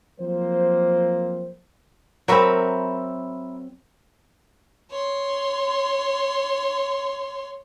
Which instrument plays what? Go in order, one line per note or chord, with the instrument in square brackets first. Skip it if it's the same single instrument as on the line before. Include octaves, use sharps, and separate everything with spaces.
[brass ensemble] F3 F#3 A#3 C4 C5
[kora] F#3 C4 [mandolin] A#4 E5 B5
[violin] C#5 C6